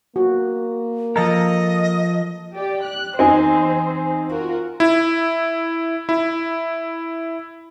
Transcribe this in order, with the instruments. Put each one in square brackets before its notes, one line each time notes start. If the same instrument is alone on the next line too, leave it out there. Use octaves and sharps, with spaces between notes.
[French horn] A#3 [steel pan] F#4
[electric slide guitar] F3 A4 A#4 [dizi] D#5 [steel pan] A#5
[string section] G4 D5
F#6
[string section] E2 C5 [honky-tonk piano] C4 D#4 G#5
[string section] F4 F#4 A#4
[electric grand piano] E4
E4